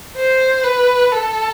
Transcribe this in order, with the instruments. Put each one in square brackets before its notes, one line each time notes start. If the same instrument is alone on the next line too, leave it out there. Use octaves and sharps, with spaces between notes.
[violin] C5
B4
A4